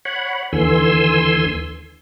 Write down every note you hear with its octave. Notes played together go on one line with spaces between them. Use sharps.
C#5 F#5 B5
D#2 D3 E3 G#5 C6 E6